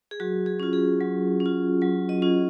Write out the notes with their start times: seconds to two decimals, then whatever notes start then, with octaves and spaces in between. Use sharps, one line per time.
0.11 G#4
0.20 F#3 F#4
0.46 G#4
0.60 C#4 F4
0.73 G#4
1.01 F#3
1.40 C#4
1.46 F4
1.82 F#3
2.09 D#5
2.22 C#4 F4